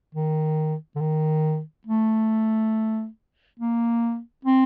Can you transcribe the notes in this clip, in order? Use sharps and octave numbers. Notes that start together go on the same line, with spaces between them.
D#3
D3
D#3
A3
A#3
C4